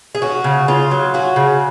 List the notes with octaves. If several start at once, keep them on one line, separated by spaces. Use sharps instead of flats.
G#4
C#4 F#4
C#3
C#3 F4
F#3
C#4 F#4
C#3